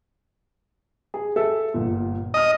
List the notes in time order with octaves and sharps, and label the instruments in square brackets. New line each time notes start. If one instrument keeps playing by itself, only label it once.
[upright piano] G#4
A4 E5
G1 A#2
[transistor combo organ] D#5 [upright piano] D#6 F6